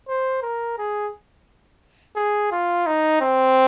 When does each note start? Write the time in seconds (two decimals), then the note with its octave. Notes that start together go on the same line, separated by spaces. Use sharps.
0.08 C5
0.42 A#4
0.78 G#4
2.16 G#4
2.52 F4
2.86 D#4
3.21 C4